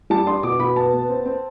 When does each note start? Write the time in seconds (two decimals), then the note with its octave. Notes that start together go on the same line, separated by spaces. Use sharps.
0.10 G3 A5
0.27 D4 C6
0.43 B2 D6
0.59 B2 B5
0.76 B3 A5
0.93 B3
1.10 C4
1.26 C4